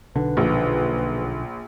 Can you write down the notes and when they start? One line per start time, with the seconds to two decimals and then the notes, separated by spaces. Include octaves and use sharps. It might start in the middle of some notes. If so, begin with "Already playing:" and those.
0.15 B1 D3 B4
0.37 A#1